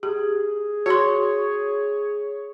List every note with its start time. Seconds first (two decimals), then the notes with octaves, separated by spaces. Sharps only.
0.03 G4 G#4
0.86 F#4 C#5 C6